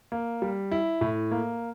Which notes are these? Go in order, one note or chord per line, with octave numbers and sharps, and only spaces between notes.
A#3
G3
E4
A2
A#3